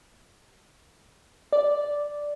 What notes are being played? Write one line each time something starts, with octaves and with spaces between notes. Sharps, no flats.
D5